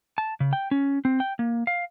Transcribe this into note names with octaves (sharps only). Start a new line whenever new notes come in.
A5
C#3
G5
C#4
C4
G5
A#3
F5